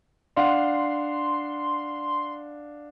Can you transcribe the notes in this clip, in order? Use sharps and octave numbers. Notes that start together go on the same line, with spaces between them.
D4 F5 F#5 C6